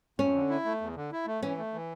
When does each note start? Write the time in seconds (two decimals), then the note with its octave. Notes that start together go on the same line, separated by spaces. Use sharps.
0.18 F2 C#4
0.34 D3
0.50 E4
0.65 A3
0.81 E2
0.96 D3
1.12 E4
1.26 A3
1.42 E3 C#4
1.57 A3
1.73 E3